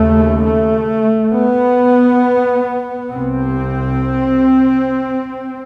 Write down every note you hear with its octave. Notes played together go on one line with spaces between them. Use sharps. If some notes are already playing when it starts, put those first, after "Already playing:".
Already playing: D#2 C#3 A3
A3
B3
C2 C3 C4